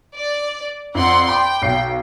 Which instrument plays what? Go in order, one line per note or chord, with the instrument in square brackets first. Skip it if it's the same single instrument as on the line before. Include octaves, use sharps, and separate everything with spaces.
[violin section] D5
[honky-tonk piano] F2 [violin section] D5 F#5 C6
[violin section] G5 [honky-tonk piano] B5 D6
[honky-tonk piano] B1 C#5 C7